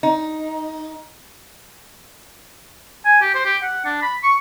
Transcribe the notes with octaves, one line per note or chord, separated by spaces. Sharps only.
D#4
G#5
G4
C5
G4
F#5
D4
B5
C#6